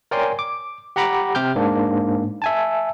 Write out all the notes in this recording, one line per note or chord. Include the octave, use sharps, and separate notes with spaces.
A#4 C#5 D5 G5 G#5 C6
D6
G4 F#5 A#5 B5 D6
C3 G4 D6 F6 G6
G#2 A#3 D4
E5 G#5 A5